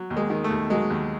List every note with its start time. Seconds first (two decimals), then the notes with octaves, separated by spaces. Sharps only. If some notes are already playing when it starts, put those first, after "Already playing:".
Already playing: F#3
0.10 D#2
0.17 G#3
0.30 D#3
0.44 A3
0.50 D#2
0.70 F#3 G#3
0.90 D#2